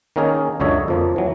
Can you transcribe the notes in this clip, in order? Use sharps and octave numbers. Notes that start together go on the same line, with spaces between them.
D#3 A#3 C#4 D#4 G#4 A#4
C#2 F#2 D3 C#5 D#5 E5
F2 F3 A#3
E3 F#3